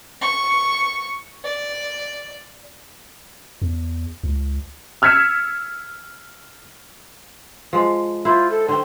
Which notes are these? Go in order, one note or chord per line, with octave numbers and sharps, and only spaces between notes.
C#6
D5
E2
C#2
E6 F6 G#6 B6 C#7 E7
F3 G#3
E4 F4 C5
A4
D3 C4 C6